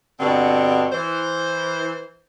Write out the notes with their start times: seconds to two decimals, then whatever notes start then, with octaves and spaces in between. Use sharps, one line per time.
0.20 G2 B2 D3 C4
0.91 E3 C5